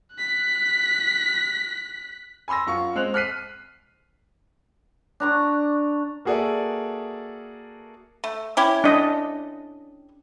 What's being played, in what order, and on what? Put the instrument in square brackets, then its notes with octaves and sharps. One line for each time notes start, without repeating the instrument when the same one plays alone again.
[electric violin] F#6 B6
[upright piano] G#5 B5 C6 E6 A#6
F#2 F4 C#6 C#7
G#3 C4 F#6 F7
F6 F#6 B6 C7 D#7
[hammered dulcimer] D4 A#5 C#6
[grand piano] A#3 F#4 G#4 A4 D5 E5
[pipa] A3
C#4 E4 G4
[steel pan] D4 D#5